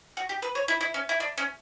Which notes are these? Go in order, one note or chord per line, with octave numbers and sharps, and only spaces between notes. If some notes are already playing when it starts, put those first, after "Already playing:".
F#4
G4
B4
C#5
E4
E4
C#4
E4
D4
C#4